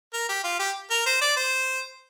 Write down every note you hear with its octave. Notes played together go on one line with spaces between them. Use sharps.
A#4
G4
F4
G4
A#4
C5
D5
C5